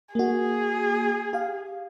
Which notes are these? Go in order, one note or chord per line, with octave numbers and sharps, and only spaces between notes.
A#3 F#4 G#4
G4 F5